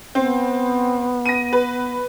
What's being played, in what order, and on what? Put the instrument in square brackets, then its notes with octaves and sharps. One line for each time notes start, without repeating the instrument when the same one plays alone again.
[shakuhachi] B3 [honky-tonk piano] C4
[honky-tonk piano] A#6 D#7
B4